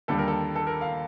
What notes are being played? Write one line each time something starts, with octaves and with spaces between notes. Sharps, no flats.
D#2 D3 G3 A4
A#4
A4
A4
A#4
F5